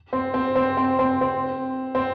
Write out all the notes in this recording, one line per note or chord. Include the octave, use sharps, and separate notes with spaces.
C4
C4
C4
C4
C4
C4
C4